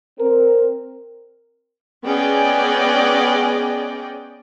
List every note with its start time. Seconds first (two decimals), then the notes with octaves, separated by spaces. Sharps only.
0.18 C4 A#4
2.06 B3 C#4 G#4 D5 D#5 G5